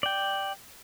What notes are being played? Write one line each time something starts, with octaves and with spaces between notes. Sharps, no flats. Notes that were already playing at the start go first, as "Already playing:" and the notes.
D5 G5